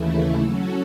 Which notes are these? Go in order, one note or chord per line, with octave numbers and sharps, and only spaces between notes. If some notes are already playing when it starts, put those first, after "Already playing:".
Already playing: D#2 C#3 E3 A3 E4
F#3 C#4 F#4 A4